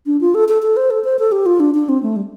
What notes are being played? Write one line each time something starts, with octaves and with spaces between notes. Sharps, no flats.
D4
F4
A4
A4
A4
C5
A4
C5
A4
G4
F4
D4
D4
C4
A3
G3